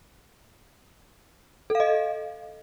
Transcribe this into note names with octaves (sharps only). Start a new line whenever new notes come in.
A4 D#5 F5